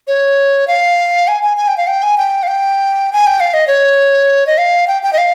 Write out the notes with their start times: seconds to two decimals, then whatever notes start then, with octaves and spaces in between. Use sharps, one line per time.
0.08 C#5
0.68 F5
1.28 G#5
1.43 G#5
1.57 G#5
1.68 G5
1.77 F5
1.87 G5
2.03 G#5
2.18 G5
2.43 F5
2.48 G5
3.13 G#5
3.27 G5
3.40 F5
3.54 D#5
3.67 C#5
4.47 D#5
4.58 F5
4.88 G5
5.03 G5
5.13 D#5
5.18 F5